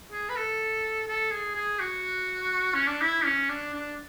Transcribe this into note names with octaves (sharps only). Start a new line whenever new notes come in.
G#4
B4
A4
A4
G#4
G#4
F#4
C#4
D4
E4
C#4
D4
D4